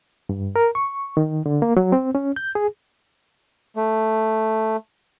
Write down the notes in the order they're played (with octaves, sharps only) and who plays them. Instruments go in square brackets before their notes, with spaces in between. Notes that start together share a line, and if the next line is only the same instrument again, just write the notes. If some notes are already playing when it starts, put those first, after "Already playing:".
[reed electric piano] G2
A#4
C#6
D#3
D3
A#3
F#3
C4
C#4
G6
G#4
[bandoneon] A3